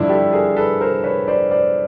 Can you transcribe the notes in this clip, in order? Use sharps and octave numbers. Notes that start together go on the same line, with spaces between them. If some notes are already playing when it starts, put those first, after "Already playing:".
Already playing: G2 D3 F3 D4 E4
G4 A4
G#4 A#4
A4 B4
A#4 C5
B4 C#5
C5 D5
C5 D5